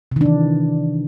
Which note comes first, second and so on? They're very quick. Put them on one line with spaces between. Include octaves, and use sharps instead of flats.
C3 D#3 D4 E3